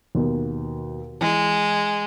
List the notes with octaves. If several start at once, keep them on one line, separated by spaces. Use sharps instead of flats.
D#2 B2
E3 G#3